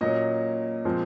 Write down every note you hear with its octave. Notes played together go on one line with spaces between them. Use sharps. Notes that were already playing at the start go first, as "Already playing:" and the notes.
A#2 F#3 C#4 D#5
A#2 F3 G#3 C4